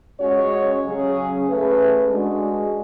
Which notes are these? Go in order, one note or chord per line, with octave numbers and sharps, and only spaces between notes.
G#3 C#4 F#4 C#5
C#3 F#3 C#4 G#4
A3 C#4 G#4 B4
G#3 D4 F#4